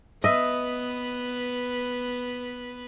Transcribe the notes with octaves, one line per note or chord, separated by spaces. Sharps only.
B3 B4 D#5 E5